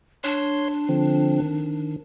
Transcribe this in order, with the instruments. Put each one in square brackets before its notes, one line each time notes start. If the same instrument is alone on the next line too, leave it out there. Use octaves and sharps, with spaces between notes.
[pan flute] D4 [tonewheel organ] C#5 C6
[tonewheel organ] D3 F3 C4
D#3